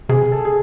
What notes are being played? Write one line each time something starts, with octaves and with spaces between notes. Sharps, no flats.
C3 G#4
A4
G#4